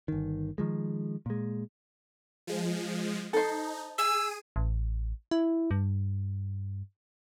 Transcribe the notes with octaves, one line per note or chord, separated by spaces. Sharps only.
G1 D#3
D#3 F3 G#3
A#2 G#3
F3 G#3
D#4 A4 C5
G#4 E6 D#7
A1
E4
G2